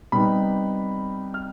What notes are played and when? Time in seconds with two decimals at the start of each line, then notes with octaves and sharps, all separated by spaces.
0.12 C3 G3 B3 D#4 B5
1.34 F6